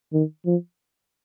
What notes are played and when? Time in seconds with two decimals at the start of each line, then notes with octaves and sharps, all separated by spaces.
0.13 D#3
0.46 F3